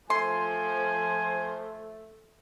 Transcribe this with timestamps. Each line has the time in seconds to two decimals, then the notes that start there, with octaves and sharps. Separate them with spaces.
0.10 F3 A3 C5 G#5 C6